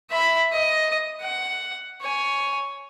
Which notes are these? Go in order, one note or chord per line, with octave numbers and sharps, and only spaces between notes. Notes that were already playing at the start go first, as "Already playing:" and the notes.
E5 B5
D#5
F#5
C#5 G#5